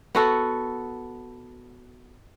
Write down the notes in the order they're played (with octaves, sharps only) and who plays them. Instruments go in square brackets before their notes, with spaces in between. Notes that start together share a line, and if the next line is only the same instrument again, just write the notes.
[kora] B3 F#4 A4